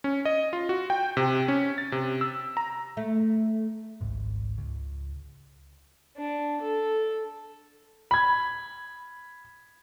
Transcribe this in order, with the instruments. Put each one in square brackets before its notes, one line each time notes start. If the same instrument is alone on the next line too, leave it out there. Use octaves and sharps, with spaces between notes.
[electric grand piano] C#4
D#5
F4
F#4
G5
C3
C#4
A6
C3
E6
A#5
[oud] A3
[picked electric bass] G#1 C#2 G#2
C#2
[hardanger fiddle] D4
A4
[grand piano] B5 G#6